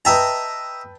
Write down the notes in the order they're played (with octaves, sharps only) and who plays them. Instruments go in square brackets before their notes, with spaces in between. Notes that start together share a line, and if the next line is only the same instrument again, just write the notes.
[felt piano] B4 G5 A5 [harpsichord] D#5 E5 A#5